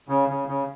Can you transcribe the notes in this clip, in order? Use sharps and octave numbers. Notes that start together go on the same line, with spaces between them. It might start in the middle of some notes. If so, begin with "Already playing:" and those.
C#3
C#3
C#3